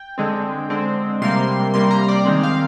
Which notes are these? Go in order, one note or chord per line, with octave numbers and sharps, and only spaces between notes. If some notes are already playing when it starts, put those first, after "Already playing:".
Already playing: G5
D3 G#3 C4
D3 G#3 C4
C3 G3 A#3 C6
C3 G3 A#3 C6
A#5
D5
D#3 G#3 C4
F5